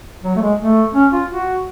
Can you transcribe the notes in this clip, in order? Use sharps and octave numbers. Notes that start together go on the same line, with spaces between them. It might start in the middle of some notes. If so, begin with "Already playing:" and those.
F#3
A3
G#3
A3
C#4
F4
F#4